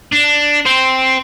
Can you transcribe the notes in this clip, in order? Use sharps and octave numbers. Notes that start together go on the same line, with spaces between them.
D4
C5 G5